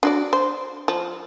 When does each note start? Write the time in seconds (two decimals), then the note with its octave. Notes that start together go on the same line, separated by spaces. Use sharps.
0.03 D4 F#4 D5
0.33 C5
0.88 F3